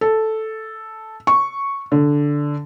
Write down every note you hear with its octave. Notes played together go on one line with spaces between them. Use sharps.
A4
C#6
D3